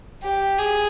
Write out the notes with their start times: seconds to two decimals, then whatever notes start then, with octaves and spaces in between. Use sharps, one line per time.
0.24 G4
0.58 G#4